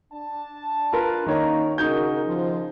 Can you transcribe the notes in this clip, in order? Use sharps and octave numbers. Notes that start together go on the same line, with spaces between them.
D4 A5
F4 A#4 B4
D#3 A#3 C#4 D#4 C#5 A#5
C#3 D#4 F#4 A#4 G6
D#3 F3